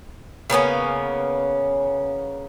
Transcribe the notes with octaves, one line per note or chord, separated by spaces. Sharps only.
C#3 A#3 B3 C#4